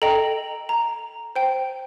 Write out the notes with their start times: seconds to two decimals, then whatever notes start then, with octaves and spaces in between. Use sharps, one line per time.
0.02 A4 D#5 G5 A#5
0.69 A#5
1.36 C5 G5